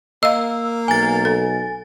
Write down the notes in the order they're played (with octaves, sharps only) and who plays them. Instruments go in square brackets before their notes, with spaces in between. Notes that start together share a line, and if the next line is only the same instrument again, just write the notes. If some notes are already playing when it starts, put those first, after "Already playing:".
[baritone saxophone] A#3 [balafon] D#5 F5 [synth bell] E6
[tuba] B1 [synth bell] G#5 A6
[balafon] A4